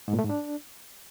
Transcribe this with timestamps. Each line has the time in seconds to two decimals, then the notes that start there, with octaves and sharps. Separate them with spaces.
0.08 G#2
0.13 A#2
0.19 A3
0.24 G#2
0.29 D4